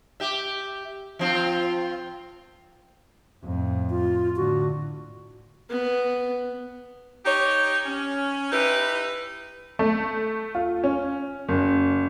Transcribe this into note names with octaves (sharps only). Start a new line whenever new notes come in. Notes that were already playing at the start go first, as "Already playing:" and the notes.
G4 E5
F3 C4 F4
F2 A2
F4
A2 D3 F#4
B3
D#4 G4 C#5
C#4
D#4 E4 G4 B4
A3
F4
C#4
F#1